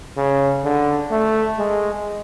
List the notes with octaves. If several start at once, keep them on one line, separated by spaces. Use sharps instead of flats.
C#3
D3
A3
G#3